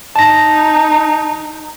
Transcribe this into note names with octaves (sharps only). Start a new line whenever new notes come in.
D#4 A5 A#6